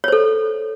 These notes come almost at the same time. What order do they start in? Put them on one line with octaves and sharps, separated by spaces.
C#5 C5 A4